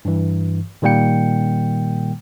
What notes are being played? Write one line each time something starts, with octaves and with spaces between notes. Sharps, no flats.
G2 E3
A#2 D#3 G3 A#3 G5 C#7